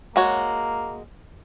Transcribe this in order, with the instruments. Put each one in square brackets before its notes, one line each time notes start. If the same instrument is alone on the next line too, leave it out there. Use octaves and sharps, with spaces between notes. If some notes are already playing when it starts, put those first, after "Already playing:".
[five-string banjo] G#3 F#4 C#5 [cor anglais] A#3